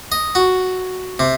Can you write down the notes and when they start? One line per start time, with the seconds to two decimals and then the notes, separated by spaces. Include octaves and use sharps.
0.12 D#5
0.35 F#4
1.19 C3